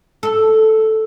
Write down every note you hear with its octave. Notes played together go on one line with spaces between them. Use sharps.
A4